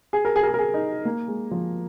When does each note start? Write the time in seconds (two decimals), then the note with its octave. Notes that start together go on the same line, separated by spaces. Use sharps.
0.13 G#4
0.25 A#4
0.36 G#4
0.43 A#4
0.48 G#4
0.54 A#4
0.58 G#4
0.74 D#4
1.05 A#3
1.28 G#3
1.51 F3